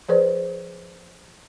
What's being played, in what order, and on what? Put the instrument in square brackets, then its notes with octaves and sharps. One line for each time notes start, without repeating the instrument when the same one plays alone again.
[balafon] F3 G#4 B4 C5 D5